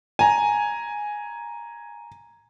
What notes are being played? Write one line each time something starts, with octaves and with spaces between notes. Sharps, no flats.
G#5 A#5